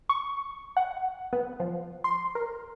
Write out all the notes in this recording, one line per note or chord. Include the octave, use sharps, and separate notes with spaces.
C#6
F#5
B3
F3
C6
A#4